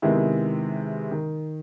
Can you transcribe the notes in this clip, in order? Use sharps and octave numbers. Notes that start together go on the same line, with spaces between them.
C3 D#3 G#3 B3 E4
D#3